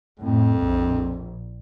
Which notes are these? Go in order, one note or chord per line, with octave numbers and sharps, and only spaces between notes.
F2 A2
A#1